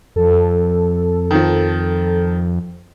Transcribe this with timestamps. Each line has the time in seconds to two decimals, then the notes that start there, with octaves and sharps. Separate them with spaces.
0.16 F2 A4
1.31 D#3 F3